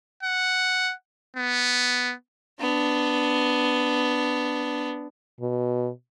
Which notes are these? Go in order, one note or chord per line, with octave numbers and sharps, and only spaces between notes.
F#5
B3
B3 D4
B2